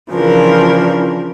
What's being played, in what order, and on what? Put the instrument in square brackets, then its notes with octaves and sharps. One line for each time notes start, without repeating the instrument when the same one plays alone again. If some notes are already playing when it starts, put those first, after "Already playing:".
[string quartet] C#3 E3 F3 D4 A#4